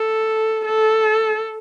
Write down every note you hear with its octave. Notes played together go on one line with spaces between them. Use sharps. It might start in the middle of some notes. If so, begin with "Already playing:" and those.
Already playing: A4
A4